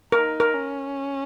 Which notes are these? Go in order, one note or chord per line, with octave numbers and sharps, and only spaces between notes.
D#4 A#4
A#4
C#4